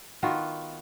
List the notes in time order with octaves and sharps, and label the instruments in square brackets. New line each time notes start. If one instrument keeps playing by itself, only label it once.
[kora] D#3 B3 F4 F#4